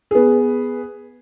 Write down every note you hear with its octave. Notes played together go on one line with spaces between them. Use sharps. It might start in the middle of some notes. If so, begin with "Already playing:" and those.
B3 G#4